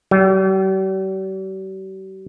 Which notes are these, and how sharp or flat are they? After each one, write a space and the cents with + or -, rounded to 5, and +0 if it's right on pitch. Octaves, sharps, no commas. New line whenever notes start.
G3 -45